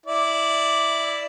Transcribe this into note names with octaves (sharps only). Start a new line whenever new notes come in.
E4 D5